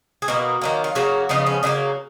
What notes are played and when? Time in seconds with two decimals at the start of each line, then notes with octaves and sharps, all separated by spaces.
0.22 G#4
0.28 B2 A#3 F#4
0.62 D#3 F#3 A#3
0.84 F4
0.95 C#3 F#3 A#3 F#4
1.29 C#3 F3 B3 D#4
1.46 C#4
1.63 C#3 F#3 A#3 D#4